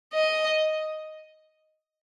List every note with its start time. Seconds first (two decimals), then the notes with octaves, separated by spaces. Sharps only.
0.14 D#5